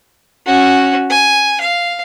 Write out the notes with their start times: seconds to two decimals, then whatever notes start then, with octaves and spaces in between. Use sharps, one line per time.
0.46 C#4 F#4
1.10 G#5
1.61 F5